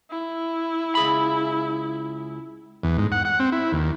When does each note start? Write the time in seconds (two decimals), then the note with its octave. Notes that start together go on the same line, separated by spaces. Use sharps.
0.11 E4
0.95 C#2 G#4 B5
2.83 E2
2.98 G#2
3.12 F#5
3.25 F#5
3.40 C4
3.52 E4
3.72 D#2